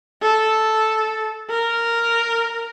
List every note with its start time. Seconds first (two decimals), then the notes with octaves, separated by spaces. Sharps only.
0.22 A4
1.50 A#4